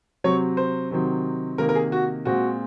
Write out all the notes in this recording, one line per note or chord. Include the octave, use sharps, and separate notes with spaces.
C3 F#3 C4 C#5
C5
C3 D#3 F#3 C4
C3 D#3 A#3 A#4
A#4
G#4
F#4
A#2 G#3 C4 F#4